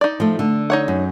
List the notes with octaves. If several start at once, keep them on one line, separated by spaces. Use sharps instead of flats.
D#4 D5
F3 A3
D3
D#4 C#5 F#5
F#2